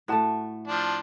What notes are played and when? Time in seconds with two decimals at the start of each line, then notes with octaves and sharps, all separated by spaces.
0.08 A2 A3 F#4 F#5 A5
0.67 F3 D4